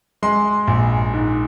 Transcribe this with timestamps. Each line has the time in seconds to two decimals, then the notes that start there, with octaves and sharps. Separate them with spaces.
0.22 G#3 C6
0.68 A#1
1.13 G#2